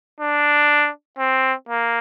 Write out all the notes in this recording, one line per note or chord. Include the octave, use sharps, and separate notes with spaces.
D4
C4
A#3